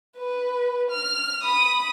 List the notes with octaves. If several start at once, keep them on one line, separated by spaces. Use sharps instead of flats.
B4
F6
B5 D#6